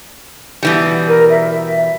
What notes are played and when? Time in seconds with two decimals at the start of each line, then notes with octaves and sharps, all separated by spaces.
0.63 B2 E3 G3
1.08 A#4
1.30 E5